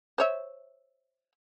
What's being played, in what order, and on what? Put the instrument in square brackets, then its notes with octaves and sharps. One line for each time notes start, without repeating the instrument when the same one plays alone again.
[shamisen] C5 C#5 E5